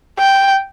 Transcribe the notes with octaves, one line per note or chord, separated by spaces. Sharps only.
G5